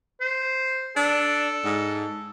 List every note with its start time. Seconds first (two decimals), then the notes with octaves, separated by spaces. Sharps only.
0.21 C5
0.96 D4 A4
1.65 G#2